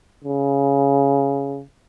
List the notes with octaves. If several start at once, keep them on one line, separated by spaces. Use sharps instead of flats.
C#3